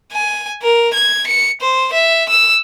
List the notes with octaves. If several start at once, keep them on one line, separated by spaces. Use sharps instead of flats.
G#5
A#4
G#6
C#7
C5
E5
E6